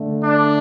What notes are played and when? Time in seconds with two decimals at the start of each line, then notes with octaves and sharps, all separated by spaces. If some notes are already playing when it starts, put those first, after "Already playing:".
Already playing: D3 A3
0.23 D4